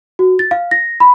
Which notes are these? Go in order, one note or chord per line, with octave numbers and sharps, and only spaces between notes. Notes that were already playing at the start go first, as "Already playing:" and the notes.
F#4
A6
F5
A#6
B5